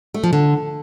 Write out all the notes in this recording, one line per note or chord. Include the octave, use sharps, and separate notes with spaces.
A3
F3
D3